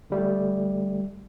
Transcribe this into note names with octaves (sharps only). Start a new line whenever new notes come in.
D3 G3 A3